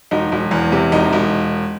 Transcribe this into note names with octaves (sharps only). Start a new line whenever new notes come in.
E1 D#4
E1
E2
C3
E1 D#4
E1